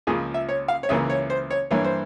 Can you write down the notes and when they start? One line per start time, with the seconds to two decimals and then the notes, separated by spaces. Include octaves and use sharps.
0.07 C#2 C#3 F3 A#3 G#4
0.34 E5
0.49 C#5
0.68 F5
0.83 C#5
0.89 C#2 C#3 E3 A#3 E5
1.10 C#5
1.30 C5
1.50 C#5
1.71 G2 E3 A#3 C#5
1.84 C5